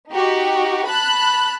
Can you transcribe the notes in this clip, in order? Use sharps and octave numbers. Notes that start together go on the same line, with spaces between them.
D#4 F#4 G4
A5 B5 F#6